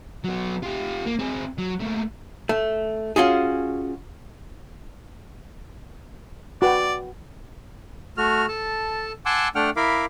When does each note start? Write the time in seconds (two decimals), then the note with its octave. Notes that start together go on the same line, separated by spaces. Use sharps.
0.24 F#3 B3
0.63 F4 G4
1.06 A#3
1.19 C4 G#4
1.59 F#3
1.80 A3 A#3
2.49 A3
3.16 C#4 F4 F#4 G#4
6.62 F#4 B4 D5 G5
8.17 A3 F#4 F6
8.48 A4 A5
9.26 F#5 G#5 A5 C6 D6 E6
9.55 A3 D4 F#5 G5 F6
9.76 E4 A#4 F5 B5 D6